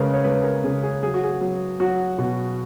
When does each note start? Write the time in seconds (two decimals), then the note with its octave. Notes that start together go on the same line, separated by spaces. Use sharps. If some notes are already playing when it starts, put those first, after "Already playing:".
Already playing: C#3 G#3 A#4 B4
0.14 C#5
0.24 G#3 B4
0.44 A#4
0.64 C#3 G#4
0.83 G#4
1.03 F#3 G#4
1.14 F#4
1.24 G#4
1.41 F#3
1.80 F#3 F#4
2.18 B2